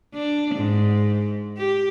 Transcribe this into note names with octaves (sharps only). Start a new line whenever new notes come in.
D4
G#2
G4